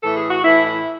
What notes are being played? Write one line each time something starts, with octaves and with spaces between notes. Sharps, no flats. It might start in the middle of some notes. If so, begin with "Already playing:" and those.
A2 E3 A4
G#4
F#4
A2 E3 E4
E4